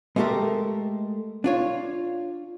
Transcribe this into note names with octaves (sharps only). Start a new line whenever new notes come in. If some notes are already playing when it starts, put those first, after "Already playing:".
G#3 A3 B3 G4 A4 A#4
D4 F4 C#5